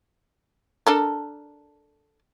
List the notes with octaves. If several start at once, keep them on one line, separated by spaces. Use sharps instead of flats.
D4 A4 A#4